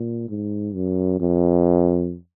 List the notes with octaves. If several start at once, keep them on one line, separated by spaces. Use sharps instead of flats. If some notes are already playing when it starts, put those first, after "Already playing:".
Already playing: A#2
G#2
F#2
F2